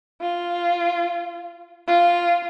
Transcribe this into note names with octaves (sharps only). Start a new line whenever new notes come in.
F4
F4